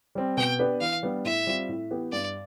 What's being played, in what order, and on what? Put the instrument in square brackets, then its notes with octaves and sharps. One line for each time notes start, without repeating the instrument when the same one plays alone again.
[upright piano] G3 C4
[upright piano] B2 [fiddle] G5
[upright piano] B3 D4 G4 B4
[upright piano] E3 [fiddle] F5
[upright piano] G3 B3 D4
[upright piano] A2 [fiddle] E5
[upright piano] G3 C4 F4
A2
E3 B3 E4 G4
[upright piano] G2 [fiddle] D5